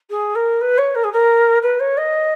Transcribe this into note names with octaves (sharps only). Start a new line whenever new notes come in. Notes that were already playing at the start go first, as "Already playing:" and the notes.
G#4
A#4
B4
C#5
A#4
G#4
A#4
B4
C#5
D#5